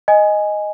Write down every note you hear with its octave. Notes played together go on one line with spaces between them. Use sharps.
D#5 G#5